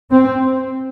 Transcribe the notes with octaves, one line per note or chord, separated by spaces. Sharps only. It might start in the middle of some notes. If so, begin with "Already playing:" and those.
C4